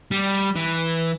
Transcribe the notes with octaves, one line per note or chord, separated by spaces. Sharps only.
G3
E3